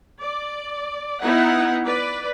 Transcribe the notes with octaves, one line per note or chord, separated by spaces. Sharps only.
D5
B3 D#4 E4 F#5
B4 D5